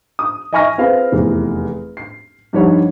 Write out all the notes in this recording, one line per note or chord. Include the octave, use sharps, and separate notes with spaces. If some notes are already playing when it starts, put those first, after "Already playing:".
D#6
D#5 E5 G#5 C#6 F6 A#6
C4 F4 G#4 B4 C5 F5
F1 E2
C7
G2 F3 G3 D#4 C#5 F#5